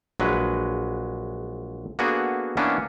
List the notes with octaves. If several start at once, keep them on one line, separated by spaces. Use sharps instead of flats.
A#1 F#3 G#3 B4
A#3 B3 D4 F#4 G#4 A4
E3 A#3 B3 C#4 D4